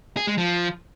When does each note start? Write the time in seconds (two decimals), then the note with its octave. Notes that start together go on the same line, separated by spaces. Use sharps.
0.17 G#4
0.27 G#3
0.38 F3